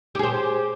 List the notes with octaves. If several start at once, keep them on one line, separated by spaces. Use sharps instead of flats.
G4 G#4 C5